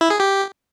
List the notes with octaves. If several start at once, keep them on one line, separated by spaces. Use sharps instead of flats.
E4
G#4
G4